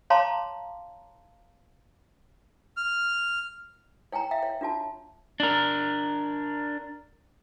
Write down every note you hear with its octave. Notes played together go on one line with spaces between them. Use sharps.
C#5 F5 A5 A#5 C6 D6
F6
C#5 G5 G#5 A#5
E5 F5 G5
C#5
D4 F4 F#4 A5
D4 A#4